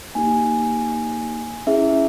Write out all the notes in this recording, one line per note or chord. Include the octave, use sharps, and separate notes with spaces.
A#3 D#4 G4 G#5
C#4 E4 G#4 E5